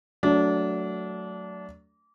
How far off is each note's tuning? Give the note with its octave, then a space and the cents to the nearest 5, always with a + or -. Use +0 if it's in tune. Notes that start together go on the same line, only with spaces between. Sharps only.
F#3 +0 A3 +0 D4 -25